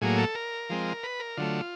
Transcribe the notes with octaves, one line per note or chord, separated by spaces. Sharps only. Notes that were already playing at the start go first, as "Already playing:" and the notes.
A2 F#3 A#3 G#4
A4
A#4
F3 G#3 C4
B4
A#4
D3 F#3 A3 F4